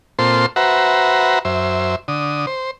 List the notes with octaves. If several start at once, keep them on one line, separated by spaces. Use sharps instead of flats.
A#2 C4 F4 A4 C5 C6
F#4 B4 C5 E5 F#5 A#5
F#2 C5 E5
D3 D#6
C5